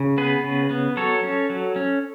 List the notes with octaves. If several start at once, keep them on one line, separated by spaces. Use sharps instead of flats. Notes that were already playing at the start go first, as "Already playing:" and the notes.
Already playing: C#3
B3 G#4 B4
C#3
B3
F#3 A4 C#5
C#4
F#3
C#4